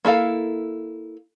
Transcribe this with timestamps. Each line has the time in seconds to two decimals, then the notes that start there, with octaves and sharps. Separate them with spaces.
0.05 A#3 E4 A4 F5